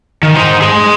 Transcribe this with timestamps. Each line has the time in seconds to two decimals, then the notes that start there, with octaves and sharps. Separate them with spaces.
0.23 D#3
0.36 D#4 C5
0.61 G#4 C6